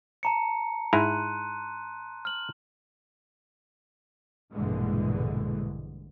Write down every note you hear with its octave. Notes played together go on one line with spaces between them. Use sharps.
A5 A#5 C#7
G#2 E4 A#5 C6 F#6 D#7
F6 F#7
A#1 G2 B2 D3 E3 G#3